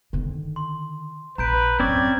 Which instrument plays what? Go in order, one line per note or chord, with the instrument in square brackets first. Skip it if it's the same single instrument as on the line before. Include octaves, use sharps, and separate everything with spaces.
[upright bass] D3 D#3
[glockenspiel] C6
[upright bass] A#1 [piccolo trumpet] B4 [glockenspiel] A#5 G6 D7
[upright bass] A1 F#2 [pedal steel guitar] C4 C#4 D5 [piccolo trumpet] G#6